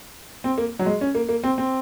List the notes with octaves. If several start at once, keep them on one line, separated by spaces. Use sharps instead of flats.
C4
A#3
F#3
G#3
C#4
A#3
A#3
C4
C4